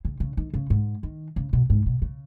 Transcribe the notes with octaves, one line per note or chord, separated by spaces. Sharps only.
C#3
C#3
D#3
C#3
G#2
D#3
C#3
B2
G#2
B2
C#3